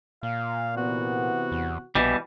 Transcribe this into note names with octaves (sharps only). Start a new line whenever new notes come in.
A#2 F5
C3 E3 B3 F#4
E2
A#1 B2 E3 G3